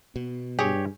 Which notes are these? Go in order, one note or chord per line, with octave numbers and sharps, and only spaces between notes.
B2 B3
G2 G4 G#4 C#5